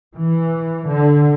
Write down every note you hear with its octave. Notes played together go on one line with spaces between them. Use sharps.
E3
D3